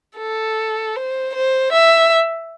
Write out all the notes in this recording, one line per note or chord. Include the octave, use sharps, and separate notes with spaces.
A4
C5
C5
E5